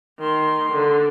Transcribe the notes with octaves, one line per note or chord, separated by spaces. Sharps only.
D#3 C6
D3